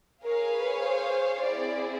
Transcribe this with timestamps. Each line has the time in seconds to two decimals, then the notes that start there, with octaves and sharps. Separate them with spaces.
0.24 G#4 A#4 C#5 F5 G#5
0.54 B4
0.83 C5
1.43 C4 E4 G#4 D5